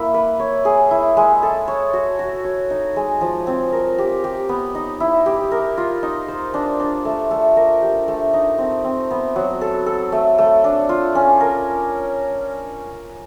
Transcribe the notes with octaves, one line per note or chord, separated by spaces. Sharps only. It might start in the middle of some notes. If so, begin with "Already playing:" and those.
Already playing: A#3 E4
B4
C#5
G#4
E4
G#3
A4
C#5
F#4
F#4
C#5
D#4
G#3
F3
C4
A#4
G4
G4
B3
D#4
E4
G4
A#4
F4
D#4
C5
D4
D4
A3
A3
A#4
G4
A3
D#4
C4
C4
B3
F#3
A4
A4
A3
A3
D4
F4
C#4
A#4